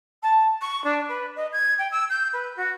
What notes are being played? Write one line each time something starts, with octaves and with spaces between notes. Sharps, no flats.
A5
C#6
D4
B4
D#5
G#6
G5
E6
G6
B4
F#4